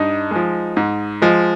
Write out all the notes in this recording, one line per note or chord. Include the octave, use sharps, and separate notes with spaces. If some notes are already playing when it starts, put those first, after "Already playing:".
Already playing: G2 D#4
F3 G#3
G#2
F3 G#3